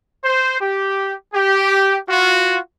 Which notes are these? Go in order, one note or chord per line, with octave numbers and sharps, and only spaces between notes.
C5
G4
G4
F4 F#4